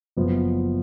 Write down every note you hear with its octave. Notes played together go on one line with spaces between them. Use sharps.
F#1 F#2 F3 B3